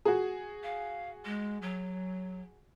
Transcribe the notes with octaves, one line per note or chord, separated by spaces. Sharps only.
F#4 G#4
F5
G#3
F#3